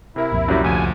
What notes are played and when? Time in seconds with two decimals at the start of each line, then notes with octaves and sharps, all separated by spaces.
0.16 C3 E4 A#4
0.32 C2 F2 A#2
0.48 F#2 F#3 G3
0.64 D2 F3 G#5